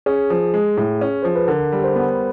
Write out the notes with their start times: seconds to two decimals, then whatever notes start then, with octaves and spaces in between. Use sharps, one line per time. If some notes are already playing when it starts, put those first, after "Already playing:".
0.06 C#4 G#4
0.30 F3
0.54 G#3
0.77 A2
1.01 C#4
1.23 F3 C5
1.36 B4
1.48 D3 A#4
1.72 G3
1.84 C5
1.95 B3